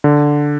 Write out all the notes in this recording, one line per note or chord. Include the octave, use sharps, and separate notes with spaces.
D3